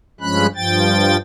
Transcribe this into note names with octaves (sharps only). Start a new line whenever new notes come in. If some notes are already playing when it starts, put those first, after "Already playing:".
G2 F3 G#3 C#4 B5 F#6
G2 F3 G5 A6